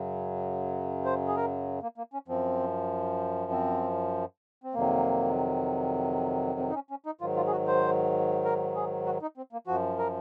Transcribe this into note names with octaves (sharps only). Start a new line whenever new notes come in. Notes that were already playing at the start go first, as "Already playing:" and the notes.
Already playing: F#2 C#3 F#3
C5
G#4
A#4
A#3
A#3
C#4
F#2 F3 C4
C4
C4
F2 C3 D#3 F#3 A#3
C4
D#4
C#4
C#4
D#4
G#2 D#3 F#3 F4
F4
G#4
F#4
C5
A#4
G#4
F#4
D#4
C4
A#3
F#2 F3 F#4
A#4